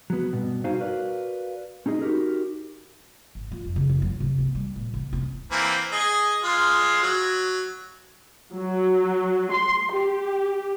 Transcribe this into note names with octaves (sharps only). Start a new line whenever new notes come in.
F#3 B3
G2 B2
D#4 F#4 C5 F5 G#5 A#5
F#4 A#4 B4 D5 F5
C#4 D#4 G#4 D#5
D#4 F#4 G4 A#4
G#1
F4
F2
C#3
F#2
F#3
C3
B3
G3
A#2
C2
C4
E3 A#3 C4
G#4 D#5 D#6
G#3 F4
F#3
F#3
C6
G4